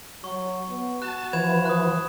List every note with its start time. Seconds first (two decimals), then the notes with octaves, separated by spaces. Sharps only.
0.24 F#3 C#6
0.70 B3
1.02 F#4 A5 F#6
1.33 E3 F3 B5 G#6 E7
1.66 D#6 F#6